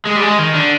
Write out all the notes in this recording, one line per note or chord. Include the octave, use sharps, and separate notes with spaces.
G#3
G3
G#3
D#3
D3